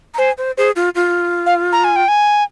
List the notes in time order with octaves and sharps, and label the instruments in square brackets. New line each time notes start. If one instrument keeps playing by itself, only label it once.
[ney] A#5
[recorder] C5 [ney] G#5
[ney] C5
[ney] G#4 [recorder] C5
[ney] F4
F4
[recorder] F5
A#5
G#5
G5
G#5